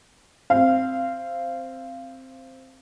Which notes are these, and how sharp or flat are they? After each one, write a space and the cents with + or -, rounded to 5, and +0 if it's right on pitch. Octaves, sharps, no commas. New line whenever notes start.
C4 +0 F5 -20